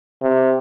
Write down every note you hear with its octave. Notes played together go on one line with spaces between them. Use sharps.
C3